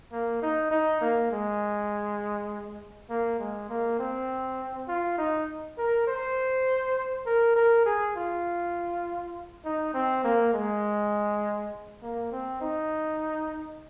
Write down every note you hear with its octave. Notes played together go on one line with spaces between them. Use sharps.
A#3
D#4
D#4
A#3
G#3
A#3
G#3
A#3
C4
F4
D#4
A#4
C5
A#4
A#4
G#4
F4
D#4
C4
A#3
G#3
A#3
C4
D#4